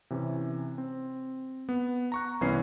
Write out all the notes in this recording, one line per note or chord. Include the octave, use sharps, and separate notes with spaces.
C3 E3 C#4
C4
B3
A#5 C#6 F#6
C2 E3 B3 C#4 E4 C7